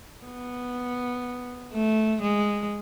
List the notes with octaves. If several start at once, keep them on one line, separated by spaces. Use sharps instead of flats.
B3
A3
G#3